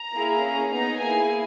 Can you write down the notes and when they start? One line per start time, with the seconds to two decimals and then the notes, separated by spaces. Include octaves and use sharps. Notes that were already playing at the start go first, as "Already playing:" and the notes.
Already playing: A#5
0.14 A#3 E4 G#4
0.43 C#4 G#4
0.72 B3 D#4 G#4 A#5
1.01 A#3 E4 G#4 G#5